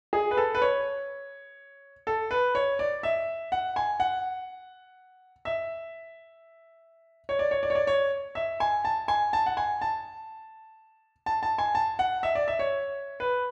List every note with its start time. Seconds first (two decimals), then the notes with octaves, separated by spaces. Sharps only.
0.13 G#4
0.31 B4
0.37 A4
0.55 B4
0.62 C#5
2.07 A4
2.31 B4
2.55 C#5
2.79 D5
3.03 E5
3.52 F#5
3.76 G#5
4.00 F#5
5.45 E5
7.29 C#5
7.39 D5
7.51 C#5
7.63 D5
7.70 C#5
7.75 D5
7.87 C#5
8.35 E5
8.60 G#5
8.85 A5
9.08 G#5
9.33 A5
9.46 F#5
9.57 G#5
9.81 A5
11.26 A5
11.43 A5
11.58 G#5
11.75 A5
11.99 F#5
12.23 E5
12.35 D5
12.48 E5
12.59 C#5
13.20 B4